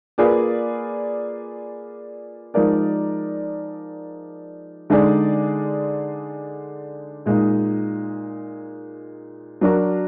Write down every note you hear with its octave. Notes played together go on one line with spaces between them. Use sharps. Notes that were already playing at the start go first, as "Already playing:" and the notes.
A#3 F4 G#4 B4 D5
F3 G#3 D#4 A#4 D5
D3 G#3 D#4 G#4 D5
A#2 G#3 D#4
F#3 D4 F#4 A#4